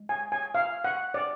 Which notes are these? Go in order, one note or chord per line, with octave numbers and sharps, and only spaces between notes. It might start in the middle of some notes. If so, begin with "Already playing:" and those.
Already playing: G#3
G#5
G#5
F5
F#5
D5